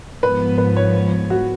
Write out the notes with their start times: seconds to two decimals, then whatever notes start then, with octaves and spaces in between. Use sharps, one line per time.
0.23 G#2 F3 B3 B4
0.58 B4
0.76 C#5
1.30 F#4